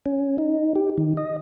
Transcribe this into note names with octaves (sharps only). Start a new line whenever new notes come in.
C#4
D#4
G4
D#3
D#5